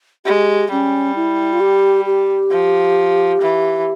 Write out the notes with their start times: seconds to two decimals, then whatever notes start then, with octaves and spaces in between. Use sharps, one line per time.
0.25 G#3 G4
0.71 G3 C#4
1.16 E4
1.53 F4
1.60 G4
2.06 G4
2.51 F3
3.41 E3